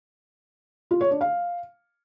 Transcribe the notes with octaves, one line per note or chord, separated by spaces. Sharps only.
F4
C#5
D4
F5